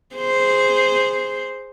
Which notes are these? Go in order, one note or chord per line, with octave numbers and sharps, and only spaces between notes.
G#4 C5